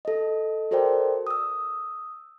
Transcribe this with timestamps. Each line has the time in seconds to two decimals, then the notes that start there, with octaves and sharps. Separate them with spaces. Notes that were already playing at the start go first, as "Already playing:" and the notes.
0.05 A4 D#5
0.71 F#4 A4 A#4 C5 D5 G5
1.27 D#6 E6